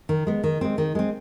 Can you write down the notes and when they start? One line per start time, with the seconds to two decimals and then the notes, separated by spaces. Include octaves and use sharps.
0.09 D#3
0.27 G#3 B3
0.44 D#3
0.61 G#3 C4
0.78 D#3
0.95 G#3 C4